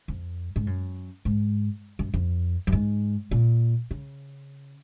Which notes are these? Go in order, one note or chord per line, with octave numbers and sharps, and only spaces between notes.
F2
G#2
F#2
G#2
F#2
F2
F#2
G#2
A#2
C#3